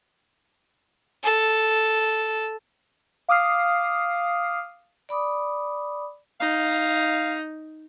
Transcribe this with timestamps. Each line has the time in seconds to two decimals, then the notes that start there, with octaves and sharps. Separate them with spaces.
1.24 A4
3.29 F5 D6 D#6 F6 C7
5.09 D5 B5 D6 D#6
6.40 D#4 F5